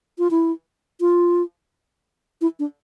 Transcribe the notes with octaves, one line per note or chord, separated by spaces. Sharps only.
F4
E4
F4
E4
D4